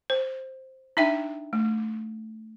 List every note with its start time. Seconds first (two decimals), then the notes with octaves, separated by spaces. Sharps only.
0.10 C5
0.97 D4 D#4 E5 G5
1.53 A3